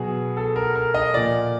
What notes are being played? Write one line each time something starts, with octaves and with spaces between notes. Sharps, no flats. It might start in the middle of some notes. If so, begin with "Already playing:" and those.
Already playing: B2 F#3 G#4
A4
A#4
A#4
D#5
A#2 F3 D5